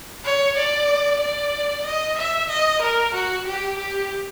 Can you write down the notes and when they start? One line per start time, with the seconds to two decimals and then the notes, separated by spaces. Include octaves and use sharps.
0.24 C#5
0.57 D5
1.21 D5
1.85 D#5
2.18 E5
2.49 D#5
2.82 A#4
3.14 F#4
3.47 G4
3.79 G4